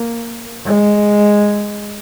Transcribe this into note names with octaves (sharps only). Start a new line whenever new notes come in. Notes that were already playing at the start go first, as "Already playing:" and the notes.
Already playing: A#3
G#3